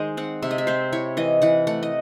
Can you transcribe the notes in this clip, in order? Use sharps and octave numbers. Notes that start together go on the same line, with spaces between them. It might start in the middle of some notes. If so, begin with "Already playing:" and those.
Already playing: D#3 G#3 C5 D#5
C4 F#5
C3 E5
D#5
E5
C4 C5
E4 C#5
E3 D#5
E3 F#5
A3 F#5
D#5